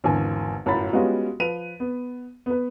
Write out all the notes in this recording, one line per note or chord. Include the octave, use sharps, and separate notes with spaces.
G#1 E2 D3 G#5
G1 F#2 A2 F#4 B5 A6
G3 G#3 B3 C#4 F4 F#4
F3 B4 D#7 F7
B3
B3 B4